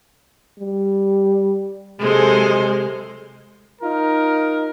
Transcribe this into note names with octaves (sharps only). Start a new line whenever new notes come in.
G3
C3 F#3 G#3 A4 C5
D#4 F4 A#4